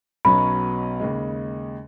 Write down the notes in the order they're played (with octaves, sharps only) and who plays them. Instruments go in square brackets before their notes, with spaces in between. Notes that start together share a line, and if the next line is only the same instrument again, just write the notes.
[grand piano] B1 B2 F#3 C#4 [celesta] B5
[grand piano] D#2 C#3 G#3